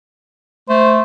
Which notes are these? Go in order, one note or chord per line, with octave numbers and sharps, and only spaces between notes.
A3 C5